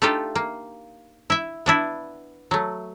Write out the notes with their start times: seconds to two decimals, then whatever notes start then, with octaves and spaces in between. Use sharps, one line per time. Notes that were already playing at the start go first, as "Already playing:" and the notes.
0.02 A3 D4 D#4 F4 G4 A4
0.35 A#3
1.30 E4 E5
1.66 B3 D4 E4
2.51 F#3 A3